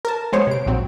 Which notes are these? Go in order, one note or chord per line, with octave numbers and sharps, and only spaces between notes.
A#4 A5
F#3 G#3 B3 C5 C#5
C3 D7
A#1 G#2 F#3 C4